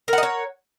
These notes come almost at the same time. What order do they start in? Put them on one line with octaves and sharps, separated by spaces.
A#4 F#5 D#5 C#5